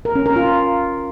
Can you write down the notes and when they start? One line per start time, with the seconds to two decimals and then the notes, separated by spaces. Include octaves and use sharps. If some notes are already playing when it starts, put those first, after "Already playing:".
0.05 A#4
0.15 C#4
0.26 A#4
0.36 F4